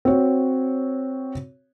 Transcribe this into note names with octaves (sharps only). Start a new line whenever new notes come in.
C4 F#4 C#5